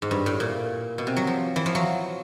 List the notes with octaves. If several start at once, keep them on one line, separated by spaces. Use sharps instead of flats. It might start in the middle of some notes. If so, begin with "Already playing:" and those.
G#2
G2
A2
A#2
B2
C3
F#3
F3
E3
F3
F#3